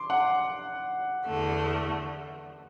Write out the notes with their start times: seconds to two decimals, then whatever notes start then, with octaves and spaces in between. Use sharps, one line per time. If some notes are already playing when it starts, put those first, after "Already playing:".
Already playing: C6 D6
0.10 F#5
1.25 E2 D3 A3